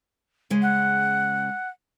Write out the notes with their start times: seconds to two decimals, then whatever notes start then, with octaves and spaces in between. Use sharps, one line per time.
0.50 C#3 G#3
0.62 F#5